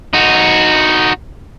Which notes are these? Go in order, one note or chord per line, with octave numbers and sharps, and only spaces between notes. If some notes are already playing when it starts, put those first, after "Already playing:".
D#4 F#4